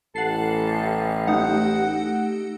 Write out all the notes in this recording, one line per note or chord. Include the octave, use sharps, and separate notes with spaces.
A1 A4 F#5 C7
A3 D#4 G4 F#5